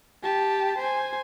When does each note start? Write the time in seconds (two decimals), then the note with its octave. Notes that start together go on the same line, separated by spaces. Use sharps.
0.23 G4 A5
0.78 C5 G#5